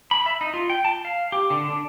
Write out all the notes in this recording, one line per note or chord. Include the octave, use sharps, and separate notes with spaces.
B5
E5
D#4
F4
G5
A5
F5
G4
D3
D4